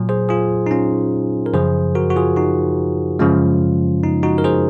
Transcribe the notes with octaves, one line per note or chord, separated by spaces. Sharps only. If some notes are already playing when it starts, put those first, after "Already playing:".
Already playing: A#2 F#3
G#4 C5
F4 G#4
D#4
C#4 F4
A#4
F#2 C#3 F3 G#4 C5
F#4 A#4
F#4
F4 G#4
D#4 F#4
F#2 C#3 F3 G#3 C#4 F4
D#4
D#4 F#4
A#4
G#4 C5